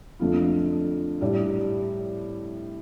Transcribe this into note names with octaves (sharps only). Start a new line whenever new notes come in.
F2 D3 F3 A3 F4
A2 G3 D4 G4 D5